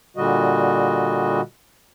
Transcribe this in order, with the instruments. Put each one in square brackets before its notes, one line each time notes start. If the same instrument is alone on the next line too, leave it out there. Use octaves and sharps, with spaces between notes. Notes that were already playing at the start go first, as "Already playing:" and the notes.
[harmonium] A#2 D3 G3 F#4 D#5